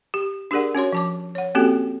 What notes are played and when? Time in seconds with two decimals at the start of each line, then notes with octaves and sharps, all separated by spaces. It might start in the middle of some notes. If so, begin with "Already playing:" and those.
0.14 G4
0.51 D4 G4 G#4 A#4 D5 F#5
0.75 C#4 F#4 C#5 C6
0.93 F3 A5 D6
1.35 C#5 F#5
1.55 A#3 C4 C#4 F#4 G4 A4